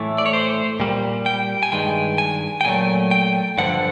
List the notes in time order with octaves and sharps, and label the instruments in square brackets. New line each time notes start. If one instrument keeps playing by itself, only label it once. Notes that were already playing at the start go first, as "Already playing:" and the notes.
Already playing: [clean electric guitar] A2 E3 A3
D5
C#5
C5
A#2 G3
G5
G#5
G2 D#3 G#3 G5
G#5
G5
A#2 F#3 A3 G#5
G5
G2 D3 F3 F#5